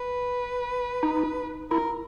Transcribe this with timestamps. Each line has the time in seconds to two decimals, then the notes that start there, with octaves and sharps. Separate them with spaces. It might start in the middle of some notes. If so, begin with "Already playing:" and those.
Already playing: B4
1.03 D#4
1.71 E4 A#4